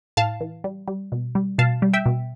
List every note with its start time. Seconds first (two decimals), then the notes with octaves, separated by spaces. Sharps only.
0.17 A2 F5 A5
0.41 E3
0.64 G3
0.88 G3
1.12 B2
1.35 G3
1.58 B2 F5 A5
1.82 G3
1.94 E5 G5
2.06 B2